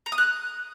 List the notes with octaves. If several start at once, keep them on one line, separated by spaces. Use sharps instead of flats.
A#5
D#6
F#6